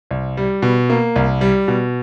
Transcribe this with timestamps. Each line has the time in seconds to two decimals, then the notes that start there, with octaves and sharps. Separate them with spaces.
0.11 C2
0.37 G3
0.62 B2
0.90 A#3
1.16 C2
1.41 G3
1.68 B2